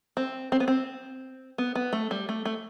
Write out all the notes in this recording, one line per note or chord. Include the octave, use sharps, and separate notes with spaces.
C4
C4
B3
C4
B3
B3
A3
G3
A3
A3